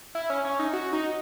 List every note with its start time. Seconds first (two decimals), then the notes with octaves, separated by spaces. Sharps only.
0.15 E4
0.30 C#4
0.45 C#4
0.59 D#4
0.73 F#4
0.93 D#4